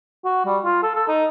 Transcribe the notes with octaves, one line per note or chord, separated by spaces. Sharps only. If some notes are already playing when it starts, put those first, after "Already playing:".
F#4
G3
F4
A4
A4
D#4